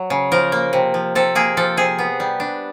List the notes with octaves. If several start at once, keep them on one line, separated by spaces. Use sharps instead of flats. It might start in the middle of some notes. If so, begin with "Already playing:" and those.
Already playing: F#3
C#3
F3 A#4
A#3
C3
F3
C3 A4
A#3 G#4
F3 A4
C3 G#4
B3
G3
D4